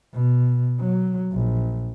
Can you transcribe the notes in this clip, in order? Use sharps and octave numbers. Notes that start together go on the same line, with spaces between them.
B2
F#3
A#1